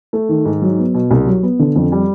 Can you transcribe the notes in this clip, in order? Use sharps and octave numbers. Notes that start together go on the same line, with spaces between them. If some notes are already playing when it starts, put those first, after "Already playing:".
A3
D#3
G#2
F#3
B3
B2
C2
F#3
B3
D3
F2
G3